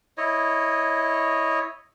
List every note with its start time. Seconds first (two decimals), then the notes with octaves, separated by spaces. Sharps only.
0.17 E4 C#5 D#5